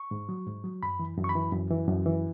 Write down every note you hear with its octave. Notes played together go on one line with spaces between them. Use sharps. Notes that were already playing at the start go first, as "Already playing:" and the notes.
Already playing: C#6
G#2
F#3
G#2
F#3
F#2 B5
E3
F#2
C#6
B5
E3
F#2
E3
F#2
E3